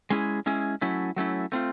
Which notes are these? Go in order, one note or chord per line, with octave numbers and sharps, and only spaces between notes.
G#3 C#4 E4 G#4
G#3 C#4 E4 G#4
F#3 A3 C#4 E4
F#3 A3 C#4 E4
A3 C4 F4